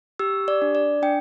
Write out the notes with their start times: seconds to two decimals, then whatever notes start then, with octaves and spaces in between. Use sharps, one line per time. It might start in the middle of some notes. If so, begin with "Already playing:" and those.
0.19 G4 E6
0.48 D5
0.62 D4
0.75 D5
1.02 D4 G5